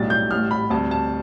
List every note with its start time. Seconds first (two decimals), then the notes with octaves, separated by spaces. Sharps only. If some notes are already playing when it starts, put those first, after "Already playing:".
Already playing: B1 A2 G3 A6
0.10 G6
0.31 A1 A2 G3 F6
0.51 B5
0.70 D2 C3 G3 A5
0.91 A5